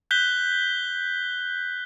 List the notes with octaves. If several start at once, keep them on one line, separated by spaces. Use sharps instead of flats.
F#6 G6 B6 G7